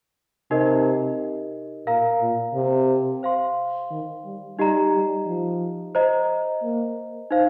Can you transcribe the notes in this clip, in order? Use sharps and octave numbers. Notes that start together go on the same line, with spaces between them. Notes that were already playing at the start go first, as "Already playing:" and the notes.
C3 D#4 G4 A#4 D#5
A#2 A#4 F5 A#5
A#2
C3
C5 F5 C6
D#3
G3
G3 D#4 G4 D#5 A#5
G3
F3
C5 D#5 A#5
A#3
D#4 C5 F5